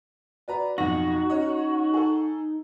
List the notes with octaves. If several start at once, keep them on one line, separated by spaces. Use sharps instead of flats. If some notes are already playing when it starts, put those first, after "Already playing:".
F#4 B4 D5 A#5
B1 F2 D#4 F#4 A#6
C#4 D#4 C#5 D#5
G#4 A4